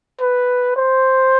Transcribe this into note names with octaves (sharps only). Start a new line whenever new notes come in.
B4
C5